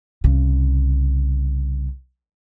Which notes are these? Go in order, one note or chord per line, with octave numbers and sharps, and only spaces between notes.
C2 C#3